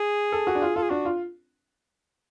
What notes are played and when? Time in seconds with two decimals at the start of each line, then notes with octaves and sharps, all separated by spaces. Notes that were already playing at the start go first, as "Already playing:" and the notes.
Already playing: G#4
0.32 A4
0.47 F#4
0.55 D4
0.62 F4
0.76 F4 A4
0.83 G#4
0.90 D4 F#4
1.05 F4